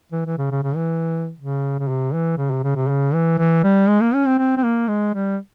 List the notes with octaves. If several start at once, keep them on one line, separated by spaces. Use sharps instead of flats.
E3
E3
C#3
C#3
C#3
E3
C#3
C#3
C3
E3
C#3
C3
C#3
C3
C#3
E3
E3
G3
G#3
A#3
C#4
C4
C4
C4
A#3
G#3
G3